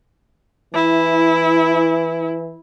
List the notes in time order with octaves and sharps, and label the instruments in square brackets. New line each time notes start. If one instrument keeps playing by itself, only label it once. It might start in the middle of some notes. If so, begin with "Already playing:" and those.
[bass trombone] E3 [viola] E4